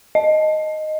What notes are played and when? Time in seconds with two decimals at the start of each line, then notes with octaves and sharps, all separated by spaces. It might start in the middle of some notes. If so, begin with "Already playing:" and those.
0.15 D#5